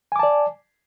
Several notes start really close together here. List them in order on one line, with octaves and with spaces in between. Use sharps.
G#5 D6 A5 D5